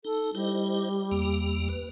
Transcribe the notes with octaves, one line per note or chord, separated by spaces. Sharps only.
D#4 A4
G3 E4 C5 D#5
E2 A#3
B4